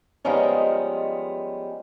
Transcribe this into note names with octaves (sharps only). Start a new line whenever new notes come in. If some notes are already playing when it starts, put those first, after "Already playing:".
F3 G3 G#3 B3 C#4 D#4